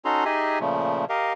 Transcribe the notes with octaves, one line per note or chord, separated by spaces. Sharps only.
C#4 D#4 F#4 A4 A#5 C6
D#4 G4 G#4 D#5 E5 G#5
A#2 C#3 F3 A3
G4 A#4 D#5 F5